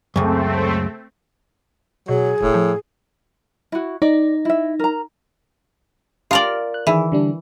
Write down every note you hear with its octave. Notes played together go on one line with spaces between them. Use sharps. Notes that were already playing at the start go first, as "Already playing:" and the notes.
C#2 F#2 A3 C4
B2 F#3 G#4
E1 A2
F3
E4 F#4
D#4 D5
E4 E5
A#4 A#5
F4 G4 A#4 D5 F5
F#6
D#3 E3 G#4
D3 G3 D4